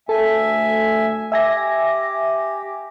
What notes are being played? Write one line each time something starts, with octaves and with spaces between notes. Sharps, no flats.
D2 A4 E5 G#5
G4 E5 G#5 A#6